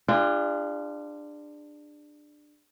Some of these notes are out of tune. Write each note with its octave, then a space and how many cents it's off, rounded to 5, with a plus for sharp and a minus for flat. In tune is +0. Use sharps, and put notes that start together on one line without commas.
D4 +15 F4 -20 G#4 -40